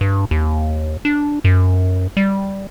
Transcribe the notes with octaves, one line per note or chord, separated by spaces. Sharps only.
G2
D#2
D4
F#2
G3